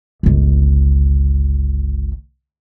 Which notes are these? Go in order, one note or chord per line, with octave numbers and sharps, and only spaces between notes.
G1 C#2